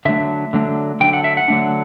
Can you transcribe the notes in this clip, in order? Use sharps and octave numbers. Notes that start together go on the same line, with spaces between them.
D3 F#3 A3 D4 E5
D3 F#3 A3 D4
D3 F#3 A3 D4 G5
F#5
E5
F#5
D3 F#3 A3 D4